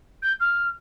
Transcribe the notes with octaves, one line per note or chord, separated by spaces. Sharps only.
G6
F6